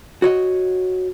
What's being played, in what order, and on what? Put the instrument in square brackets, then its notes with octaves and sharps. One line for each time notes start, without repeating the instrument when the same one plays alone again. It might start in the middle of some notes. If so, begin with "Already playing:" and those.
[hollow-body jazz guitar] F#4 C#5 D#5